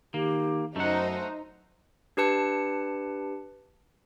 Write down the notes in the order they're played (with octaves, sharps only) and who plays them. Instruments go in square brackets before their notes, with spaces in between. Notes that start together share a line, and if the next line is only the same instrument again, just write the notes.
[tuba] D#3 [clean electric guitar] A#3 [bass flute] G4
[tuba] F#2 [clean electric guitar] A3 F#5 [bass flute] C#4 [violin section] D#4 C5
[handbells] D4 G4 B4 A5 C#7